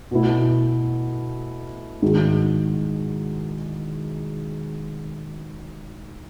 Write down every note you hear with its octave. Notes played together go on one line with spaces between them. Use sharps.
B2 A3 E4
G#2 D#3 G#3 D#4 F#4